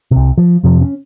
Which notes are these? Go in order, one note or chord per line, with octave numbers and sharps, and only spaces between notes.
C2 C3
F3
F2 C3 F3
C#4